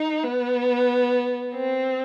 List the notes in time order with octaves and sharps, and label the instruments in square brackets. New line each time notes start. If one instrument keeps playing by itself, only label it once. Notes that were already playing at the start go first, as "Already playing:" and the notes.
Already playing: [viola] D#4
B3
C4